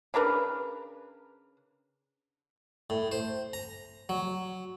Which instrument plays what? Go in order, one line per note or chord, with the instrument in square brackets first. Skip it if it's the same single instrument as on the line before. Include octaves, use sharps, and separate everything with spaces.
[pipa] C#3 D4 A#4 B4
[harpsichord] A2
C5
A#5
F#3